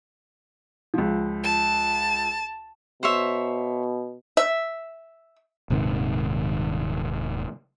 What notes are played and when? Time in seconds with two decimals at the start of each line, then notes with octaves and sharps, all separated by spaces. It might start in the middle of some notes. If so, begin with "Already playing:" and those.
0.94 C#2 F3
1.43 A5
3.03 B2 C5 C#5 E5
4.37 E5
5.70 D#1 G#2 C3 D#3